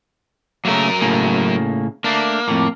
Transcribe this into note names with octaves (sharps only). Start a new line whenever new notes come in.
C#3 F#3 A3 A#3 A#4
A2 C#3 A#3
A3 A#3 D4
F2 A2